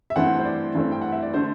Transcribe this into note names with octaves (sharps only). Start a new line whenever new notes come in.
E5
G2 E3 A3 C4 F#5
C5
D5
G2 E3 A3 C4
G5
F#5
E5
D5
D3 A3 C5